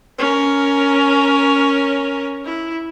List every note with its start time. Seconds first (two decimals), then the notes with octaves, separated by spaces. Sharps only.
0.18 C#4 A#4
2.44 E4